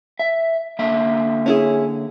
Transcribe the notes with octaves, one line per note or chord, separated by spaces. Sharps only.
E5
D3 A#3 E5
C#4 E4 G#4